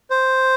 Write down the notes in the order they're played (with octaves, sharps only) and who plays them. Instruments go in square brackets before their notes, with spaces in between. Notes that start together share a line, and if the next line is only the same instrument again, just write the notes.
[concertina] C5